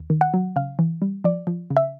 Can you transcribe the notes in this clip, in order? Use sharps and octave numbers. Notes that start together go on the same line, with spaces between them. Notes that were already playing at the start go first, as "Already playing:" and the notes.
Already playing: D#2
D#3
F#5
F#3
C#3 F5
E3
G3
F3 D5
F3
C#3
E5